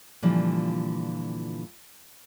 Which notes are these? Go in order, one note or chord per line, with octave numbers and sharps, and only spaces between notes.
A#2 D3 E3 F3 G3